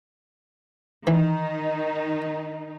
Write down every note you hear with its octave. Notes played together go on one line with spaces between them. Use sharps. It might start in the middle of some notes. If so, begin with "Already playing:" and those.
D#3 E3 D#4